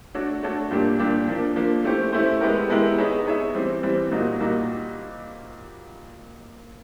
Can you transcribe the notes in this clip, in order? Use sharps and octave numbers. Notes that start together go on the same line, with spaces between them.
A3 D4 F#4 A4 C#5
A3 D4 F#4 A4 C#5
A#2 G3 A#3 D4 G4
A#2 G3 A#3 D4 G4
F3 A#3 D4
F3 A#3 D4
A3 C#4 E4 G4 C5
A3 C#4 E4 G4 C5
G#3 B3 E4 G4 A#4
G#3 B3 E4 G4 A#4
B3 D#4 G#4 C#5 E5
B3 D#4 G#4 C#5 E5
E3 G3 C4
E3 G3 C4
A#2 G3 A#3 D#4 F#4
A#2 G3 A#3 D#4 F#4